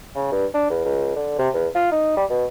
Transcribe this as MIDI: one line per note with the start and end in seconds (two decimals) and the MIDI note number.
0.16 0.28 49
0.32 0.45 43
0.54 0.68 62
0.70 0.82 40
0.85 1.14 37
1.16 1.36 50
1.39 1.49 48
1.54 1.67 40
1.75 1.90 65
1.92 2.16 63
2.17 2.25 55
2.30 2.45 47